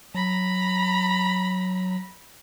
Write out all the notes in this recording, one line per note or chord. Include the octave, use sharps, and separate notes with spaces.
F#3 A#5 B5